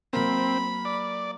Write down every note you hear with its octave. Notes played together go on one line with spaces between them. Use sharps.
F#3 A#3 C4 B5
D5